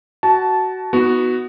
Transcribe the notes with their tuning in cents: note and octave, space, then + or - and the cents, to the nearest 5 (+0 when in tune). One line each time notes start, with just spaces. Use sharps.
F#4 +15 A5 -15
B3 +0 D#4 +45 F#4 +0